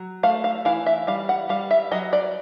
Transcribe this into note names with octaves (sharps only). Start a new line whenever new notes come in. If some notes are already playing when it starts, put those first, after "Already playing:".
Already playing: F#3
A3 F5
F5
E3 F5
E5
G3 F5
F#5
G3 F5
E5
F#3 D#5
D5